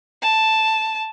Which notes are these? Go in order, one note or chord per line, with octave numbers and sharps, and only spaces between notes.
A5